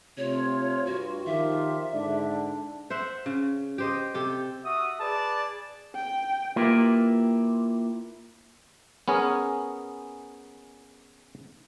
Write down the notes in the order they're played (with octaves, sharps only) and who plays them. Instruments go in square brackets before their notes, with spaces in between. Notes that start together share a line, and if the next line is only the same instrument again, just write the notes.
[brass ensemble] C3 A3 [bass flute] F4 [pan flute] C#5
[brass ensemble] G2 [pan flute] F#4
[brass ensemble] D#3 F3 F4 [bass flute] G4 [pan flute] E5
[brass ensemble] G#2 D3 D5 [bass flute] D4
[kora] C5 E5 F#5
C#3
G4 C5 D#5
C3 G4 A4
[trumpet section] F#4 E5 D#6
G#4 B4 D5 A5
[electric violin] G5
[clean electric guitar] A#3 E4 F4 G4 A#4 B4
[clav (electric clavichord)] B3 C#4 G#4 A#4